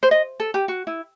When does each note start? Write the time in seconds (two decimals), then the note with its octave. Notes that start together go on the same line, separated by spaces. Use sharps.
0.03 C5
0.11 D#5
0.40 A4
0.54 G4
0.68 F#4
0.87 E4